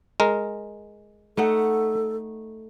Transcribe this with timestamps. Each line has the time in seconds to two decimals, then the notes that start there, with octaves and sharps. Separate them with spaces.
0.20 G#3 A#4
1.37 A3 D#4 A4 F#5